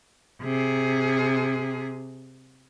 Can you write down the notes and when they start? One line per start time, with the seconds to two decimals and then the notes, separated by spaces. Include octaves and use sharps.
0.42 C3 G#4